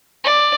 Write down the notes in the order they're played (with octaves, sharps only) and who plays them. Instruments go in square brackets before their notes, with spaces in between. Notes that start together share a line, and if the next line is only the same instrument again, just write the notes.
[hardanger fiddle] D5